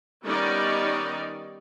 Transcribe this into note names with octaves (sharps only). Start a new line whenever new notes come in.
D#3 G3 B3 C#4 D#4 D5